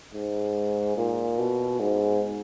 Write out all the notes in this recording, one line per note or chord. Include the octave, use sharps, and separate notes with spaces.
G#2
A#2
B2
G#2